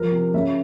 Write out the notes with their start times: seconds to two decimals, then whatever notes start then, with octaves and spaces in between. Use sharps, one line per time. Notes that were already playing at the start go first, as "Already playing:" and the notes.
Already playing: F3 A#4
0.12 C3
0.34 C#3 E5